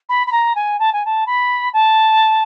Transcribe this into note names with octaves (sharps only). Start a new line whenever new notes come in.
B5
B5
A#5
G#5
A5
G#5
A5
B5
A5